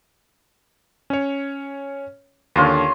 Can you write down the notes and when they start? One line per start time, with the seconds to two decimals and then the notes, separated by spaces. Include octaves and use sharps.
1.10 C#4 C#5
2.56 D#2 D3 C#4 F4 C6